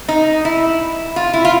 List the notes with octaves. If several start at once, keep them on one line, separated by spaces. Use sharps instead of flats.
D#4
E4
F4
E4
F4